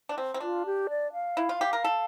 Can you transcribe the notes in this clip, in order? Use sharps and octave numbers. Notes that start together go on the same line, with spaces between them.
D4
C4
C4
D4 F4
G4
D5
F5
E4
F4
G4
A#4
A4